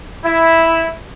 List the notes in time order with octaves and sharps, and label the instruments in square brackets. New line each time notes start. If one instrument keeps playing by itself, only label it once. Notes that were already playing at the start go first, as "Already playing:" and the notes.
[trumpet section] E4